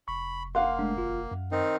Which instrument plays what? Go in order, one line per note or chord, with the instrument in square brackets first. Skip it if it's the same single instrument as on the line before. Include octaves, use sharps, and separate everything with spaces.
[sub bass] F1 [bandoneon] B5 [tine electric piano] C#6
[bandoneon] A#3 [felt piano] F5 F#5 [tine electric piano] C6
[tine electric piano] G#3 A3 D4
G#1 F4
F#2
[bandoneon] D#3 C4 D#4